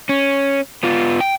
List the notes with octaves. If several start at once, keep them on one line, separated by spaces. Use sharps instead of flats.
C#4
B3 F4
G5